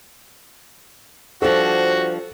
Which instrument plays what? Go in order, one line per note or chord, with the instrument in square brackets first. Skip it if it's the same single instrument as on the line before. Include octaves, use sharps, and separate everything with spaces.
[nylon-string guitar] F3 G3 D4 [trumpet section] F#4 [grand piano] A4 [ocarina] C5